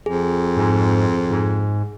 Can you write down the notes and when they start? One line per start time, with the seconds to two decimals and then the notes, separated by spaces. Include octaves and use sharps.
0.06 F2 G#4
0.57 G#2
1.31 G#2